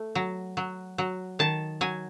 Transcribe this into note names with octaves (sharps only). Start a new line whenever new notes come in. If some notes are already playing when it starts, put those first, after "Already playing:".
Already playing: A3
F#3
F#3
F#3
D#3 A5
F#3 G#5